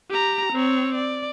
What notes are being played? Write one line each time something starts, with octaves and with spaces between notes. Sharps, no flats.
G4 A#5
C4 C#5
D5